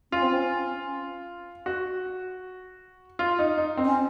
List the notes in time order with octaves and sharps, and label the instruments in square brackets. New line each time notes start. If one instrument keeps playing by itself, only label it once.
[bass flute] C#4 [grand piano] F4
[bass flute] C4
C#4
[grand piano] F#4
F4
D#4
D#4
C4
[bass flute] C#4